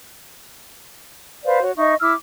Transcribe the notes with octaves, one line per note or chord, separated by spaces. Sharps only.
B4 C5 D5 F5
F#4 C#5
D#4 D#5 E5 C#6
E4 D6 E6 F6